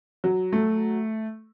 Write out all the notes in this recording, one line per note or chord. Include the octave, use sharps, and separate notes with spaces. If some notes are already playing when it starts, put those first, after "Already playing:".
F#3
A3